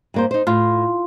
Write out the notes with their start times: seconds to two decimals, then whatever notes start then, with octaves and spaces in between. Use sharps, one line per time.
0.14 G2 A#3 C5
0.31 D#4 C5
0.47 A2 F4